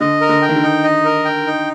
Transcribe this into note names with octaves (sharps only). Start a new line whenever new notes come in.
D3 D#5
A#4
D3
G5
D#3
D3
D#4
D#5
A#4
G5
D#4